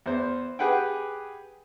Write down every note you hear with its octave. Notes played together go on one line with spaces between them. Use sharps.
E2 C5
G4 G#4 B4 F#5 G5